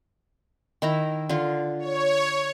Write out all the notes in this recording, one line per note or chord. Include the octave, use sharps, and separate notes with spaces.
D#3 E4 A#5
D3 F4
C#5